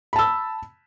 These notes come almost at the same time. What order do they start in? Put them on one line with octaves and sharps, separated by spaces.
B5 A5 E6